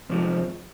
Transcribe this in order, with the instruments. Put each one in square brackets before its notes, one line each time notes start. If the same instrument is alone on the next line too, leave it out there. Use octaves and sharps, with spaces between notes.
[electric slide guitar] F2 C3 F3 G#3